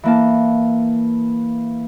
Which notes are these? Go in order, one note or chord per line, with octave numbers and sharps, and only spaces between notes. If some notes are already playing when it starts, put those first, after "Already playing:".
E3 A#3 A5